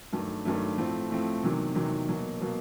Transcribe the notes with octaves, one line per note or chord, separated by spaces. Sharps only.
G2 D#3 F#3 A3
G2 D#3 F#3 A3
A2 F3 A3 C4
A2 F3 A3 C4
E2 C3 D#3 F#3
E2 C3 D#3 F#3
B2 F#3 A#3
B2 F#3 A#3